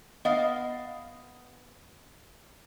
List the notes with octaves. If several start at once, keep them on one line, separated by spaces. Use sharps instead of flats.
B3 D#5 F5